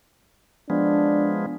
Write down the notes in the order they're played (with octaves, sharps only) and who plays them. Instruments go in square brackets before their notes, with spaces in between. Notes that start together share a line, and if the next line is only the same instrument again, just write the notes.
[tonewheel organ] F3 G#3 B3 [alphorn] D4